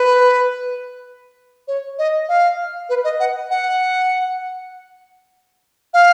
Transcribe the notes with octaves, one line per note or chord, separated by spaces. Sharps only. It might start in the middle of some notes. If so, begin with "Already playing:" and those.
Already playing: B4
C#5
D#5
F5
B4
D#5
F#5
F#5
F5